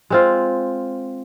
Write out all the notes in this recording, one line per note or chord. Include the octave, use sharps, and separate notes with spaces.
G#3 C4 F4